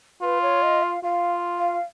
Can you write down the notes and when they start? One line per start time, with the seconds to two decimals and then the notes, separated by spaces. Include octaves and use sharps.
0.22 F4 B4
0.42 C#5
0.62 D#5
0.83 F5
1.04 F4 F5
1.59 F5